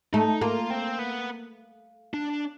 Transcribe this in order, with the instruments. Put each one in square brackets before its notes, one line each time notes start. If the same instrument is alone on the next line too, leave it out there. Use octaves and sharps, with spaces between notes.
[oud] A3 [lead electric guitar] D#4
[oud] A#3 [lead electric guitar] F4
[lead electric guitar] C4
B3
D4